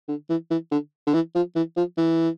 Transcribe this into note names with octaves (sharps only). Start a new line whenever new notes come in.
D3
E3
E3
D3
D3
E3
F3
E3
F3
E3